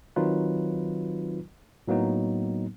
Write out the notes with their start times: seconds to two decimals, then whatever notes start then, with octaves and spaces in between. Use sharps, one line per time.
0.16 D#3 F#3 C4 D#4 F4 B4
1.88 A2 F#3 A#3 B3 D#4